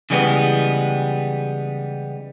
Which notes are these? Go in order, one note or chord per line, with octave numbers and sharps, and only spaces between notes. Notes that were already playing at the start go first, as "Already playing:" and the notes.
C#3 E3 G3 G#3 B3